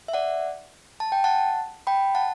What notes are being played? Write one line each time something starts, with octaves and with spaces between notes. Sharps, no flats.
E5
D5 F#5
A5
G5
F#5 A5
G5 B5
F#5 A5